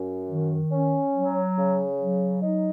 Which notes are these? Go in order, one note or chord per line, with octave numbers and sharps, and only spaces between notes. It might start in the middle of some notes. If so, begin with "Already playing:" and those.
Already playing: F#2
D#3
C#4
F#3
C#3
F#3
D#4